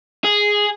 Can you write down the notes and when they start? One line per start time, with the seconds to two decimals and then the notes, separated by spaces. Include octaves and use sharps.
0.25 G#4